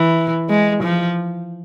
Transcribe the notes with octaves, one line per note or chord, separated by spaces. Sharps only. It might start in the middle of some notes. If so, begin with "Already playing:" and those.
Already playing: E3
G#3
F3